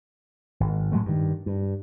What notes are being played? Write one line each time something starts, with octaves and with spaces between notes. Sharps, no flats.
G#1
A2 F#3 G#3 A3
G2 D#3
G2